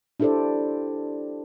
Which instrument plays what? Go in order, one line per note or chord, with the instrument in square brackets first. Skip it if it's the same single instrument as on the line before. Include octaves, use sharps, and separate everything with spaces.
[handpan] D4 E4 G4 A4 C5 D5